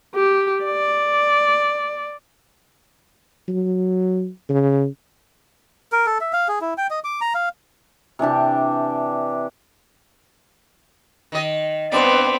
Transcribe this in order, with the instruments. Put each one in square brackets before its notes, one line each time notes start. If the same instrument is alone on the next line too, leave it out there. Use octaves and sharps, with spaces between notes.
[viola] G4
D5
[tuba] F#3
C#3
[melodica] A#4
A4
E5
F5
G#4
E4
G5
D#5
D6
A#5
F5
[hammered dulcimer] C3 E3 D4 G4
[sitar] D#3 D#5
[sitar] G2 D5 [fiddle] B3 C4 [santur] D4 C6